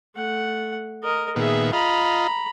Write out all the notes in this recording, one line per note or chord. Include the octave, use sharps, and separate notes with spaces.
A3 F#5
A#4 D#5
A#2 D#3 B3 G#4 E5
F4 D#5 A#5 B5